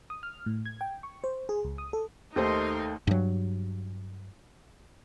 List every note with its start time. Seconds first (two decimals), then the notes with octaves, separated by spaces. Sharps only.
0.10 D#6
0.23 F6
0.46 A2
0.65 G#6
0.81 G5
1.03 C#6
1.24 C5
1.49 G#4
1.64 C#2
1.78 D#6
1.93 A4
2.36 D#2 A3 D#4 A#4 C5 C6
3.07 G2 F#3